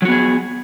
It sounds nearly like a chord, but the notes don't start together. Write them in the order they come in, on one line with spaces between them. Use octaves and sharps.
F#3 F#4 B3 G#4